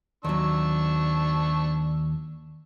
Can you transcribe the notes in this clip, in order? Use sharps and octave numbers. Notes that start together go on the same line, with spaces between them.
D#2 F#3 D4 C#6 E6